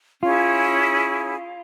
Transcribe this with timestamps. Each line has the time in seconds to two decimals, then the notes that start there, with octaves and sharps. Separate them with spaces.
0.22 C#4 E4 F4 G#4